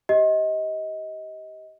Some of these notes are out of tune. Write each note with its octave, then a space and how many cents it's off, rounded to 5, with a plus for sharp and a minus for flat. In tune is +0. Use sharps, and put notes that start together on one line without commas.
G4 -10 D#5 +25